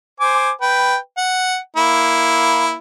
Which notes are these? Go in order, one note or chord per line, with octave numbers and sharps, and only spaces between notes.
C5 G#5 D6
B4 G5
F#5
A#3 E4